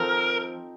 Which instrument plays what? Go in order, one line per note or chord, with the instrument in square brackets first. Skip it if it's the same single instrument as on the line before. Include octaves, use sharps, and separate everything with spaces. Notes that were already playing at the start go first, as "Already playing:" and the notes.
Already playing: [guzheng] F3 C4 D#4 A4 [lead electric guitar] A#4